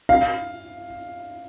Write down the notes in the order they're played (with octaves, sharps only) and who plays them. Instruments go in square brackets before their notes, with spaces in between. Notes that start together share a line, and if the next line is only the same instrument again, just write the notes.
[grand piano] F5